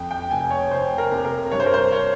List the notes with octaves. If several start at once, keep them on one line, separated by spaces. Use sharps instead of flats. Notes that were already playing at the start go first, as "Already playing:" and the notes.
Already playing: F2 G5
G5
F1 G#5
C#5
F1 C5
A#4
C3
A#4
G2 C#5
C5
A#4
C5
C#5